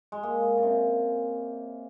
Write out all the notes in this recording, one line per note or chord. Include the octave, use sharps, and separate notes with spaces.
G#3
A#3
C#3
C3